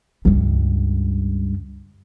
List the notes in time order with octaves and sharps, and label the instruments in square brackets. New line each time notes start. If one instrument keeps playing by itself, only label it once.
[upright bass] C#2 G2